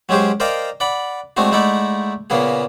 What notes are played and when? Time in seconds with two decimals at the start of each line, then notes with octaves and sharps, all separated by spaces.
0.09 F#3 G#3 C#4 G4 G#4 C5
0.40 A#4 C5 D5 D#5 F5 G5
0.80 D5 F#5 B5
1.37 G#3 A3 C4 D4 F#4
1.51 G#3 A3 D#4 E4 D5 F#5
2.30 A#2 C#3 A#3 B3 G#4